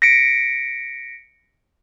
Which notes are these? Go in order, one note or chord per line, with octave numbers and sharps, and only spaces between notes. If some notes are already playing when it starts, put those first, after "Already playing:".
A#6 B6 C#7 D7